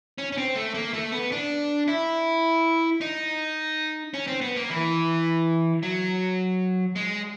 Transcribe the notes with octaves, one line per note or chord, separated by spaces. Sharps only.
C#4
C#4
C4
A3
A#3
A3
B3
D4
E4
D#4
C#4
C4
B3
A#3
E3
F#3
G#3